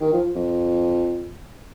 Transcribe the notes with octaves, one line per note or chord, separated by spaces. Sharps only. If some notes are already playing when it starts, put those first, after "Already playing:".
D#3
F3
F2